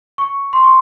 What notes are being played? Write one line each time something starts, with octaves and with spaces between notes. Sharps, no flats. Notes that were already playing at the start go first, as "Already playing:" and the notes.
C#6
C6
C#6